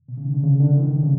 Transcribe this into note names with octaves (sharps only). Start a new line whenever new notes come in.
B2
C#3
D#3
D3
C#3
D3
E3
D#3
D3
C#3